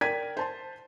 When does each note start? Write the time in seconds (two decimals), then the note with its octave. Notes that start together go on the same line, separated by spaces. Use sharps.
0.01 A#4 D5 G5 G#6 B6 D#7
0.37 C5 A5 C6